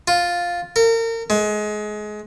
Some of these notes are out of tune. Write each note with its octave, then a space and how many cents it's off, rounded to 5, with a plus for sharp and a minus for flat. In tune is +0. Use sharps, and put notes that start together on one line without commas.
F4 +5
A#4 -35
G#3 +25